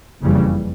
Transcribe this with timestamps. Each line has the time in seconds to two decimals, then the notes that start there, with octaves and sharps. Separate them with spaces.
0.22 F#1 F2 C#3 E3 G3